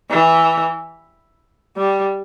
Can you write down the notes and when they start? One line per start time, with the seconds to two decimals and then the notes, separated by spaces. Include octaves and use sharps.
0.10 E3
1.77 G3